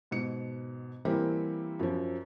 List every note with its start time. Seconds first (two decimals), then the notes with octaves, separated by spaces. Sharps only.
0.11 G#2 B2 C#7
1.05 E3 G3 A#3 C4 E4 G4
1.80 F#2 F3